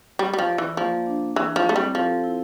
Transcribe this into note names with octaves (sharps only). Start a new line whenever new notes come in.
G3 D5
G3
F3
D5
E3
F3 A#3
D4
E3 E4
F3
A3 C4
G3
F3 A4
E4